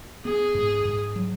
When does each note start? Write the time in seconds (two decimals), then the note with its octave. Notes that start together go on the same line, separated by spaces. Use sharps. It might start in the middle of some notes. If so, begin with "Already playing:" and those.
0.25 B3 G#4
0.55 G#2
0.85 G#2
1.16 F#3